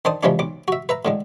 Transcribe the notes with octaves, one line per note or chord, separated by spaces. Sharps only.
D#3 D4 C5 A5 D#6
C3 E3 F3 G#3 C#4 D4
B1 D6
F#4 E5
B4 E5 A#5
A2 D3 G#3